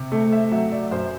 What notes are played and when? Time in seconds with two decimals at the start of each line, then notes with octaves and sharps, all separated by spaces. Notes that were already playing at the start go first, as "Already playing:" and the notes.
Already playing: C3
0.12 A3
0.32 E5
0.52 F#3 E5
0.72 D5
0.91 F#2 C5